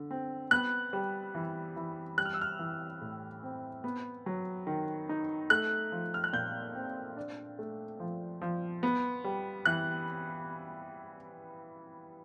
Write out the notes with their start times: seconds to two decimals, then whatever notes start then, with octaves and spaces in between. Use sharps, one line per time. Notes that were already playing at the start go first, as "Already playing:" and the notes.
Already playing: D3
0.11 C4
0.51 B3 F#6
0.93 G3
1.35 E3
1.76 E3
2.18 G3 F#6
2.25 F6
2.34 E6
2.41 F6
2.59 E3
3.01 A2
3.43 C4
3.84 B3
4.26 F#3
4.67 D#3
5.09 D#4
5.50 A3 F#6
5.92 F3
6.14 F6
6.24 F#6
6.33 A#2 G6
6.75 C4
7.16 D4
7.59 A3
8.00 F3
8.42 F3
8.83 B3
9.25 G3
9.65 E3 F#6